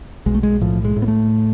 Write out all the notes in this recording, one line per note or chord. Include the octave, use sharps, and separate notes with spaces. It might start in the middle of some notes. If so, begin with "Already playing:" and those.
B1 G#3
A3
G#3
A2 F3
G#3
A2
B3
A3